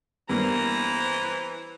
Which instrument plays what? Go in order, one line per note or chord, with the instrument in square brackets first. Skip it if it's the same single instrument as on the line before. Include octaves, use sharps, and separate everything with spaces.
[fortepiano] G2 A#3 [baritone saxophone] E3 [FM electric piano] B3 [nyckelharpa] C5 A#5